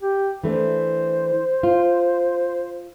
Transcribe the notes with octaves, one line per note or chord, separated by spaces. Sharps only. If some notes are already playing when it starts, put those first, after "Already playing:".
G4
E3 A3 D4 C5
F4